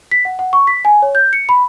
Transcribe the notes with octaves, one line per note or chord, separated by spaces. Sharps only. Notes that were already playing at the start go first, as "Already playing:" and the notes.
B6
F#5
F#5
C#6
B6
G#5
C#5
G6
C#7
B5